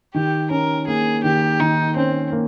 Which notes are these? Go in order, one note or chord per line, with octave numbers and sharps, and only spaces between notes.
D#3 G4
C#4 A#4
A#3 G#4
D#3 G4
D#3 D#4
C4 C#4
A#3